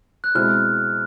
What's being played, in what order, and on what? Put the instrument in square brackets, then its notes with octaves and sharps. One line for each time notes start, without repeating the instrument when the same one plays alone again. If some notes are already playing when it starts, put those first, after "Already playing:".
[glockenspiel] F#6
[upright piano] B2 G#3 C4 E4 [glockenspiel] F6